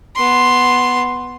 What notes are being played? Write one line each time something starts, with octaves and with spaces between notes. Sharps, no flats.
B3 C6